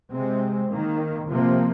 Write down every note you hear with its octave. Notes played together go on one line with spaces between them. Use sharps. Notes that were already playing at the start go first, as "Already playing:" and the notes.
C3 G#3 C4
D#3 A#3
C3 F3 A#3